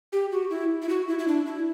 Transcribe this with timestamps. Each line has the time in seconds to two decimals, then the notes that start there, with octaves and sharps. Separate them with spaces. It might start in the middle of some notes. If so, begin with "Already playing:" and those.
0.13 G4
0.32 F#4
0.50 E4
0.82 E4
0.89 F#4
1.08 E4
1.19 E4
1.28 D4
1.46 E4